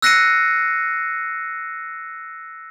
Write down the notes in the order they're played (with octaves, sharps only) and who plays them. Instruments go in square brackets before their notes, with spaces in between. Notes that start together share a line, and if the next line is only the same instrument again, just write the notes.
[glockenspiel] E6 F#6 A#6 C7 C#7 D#7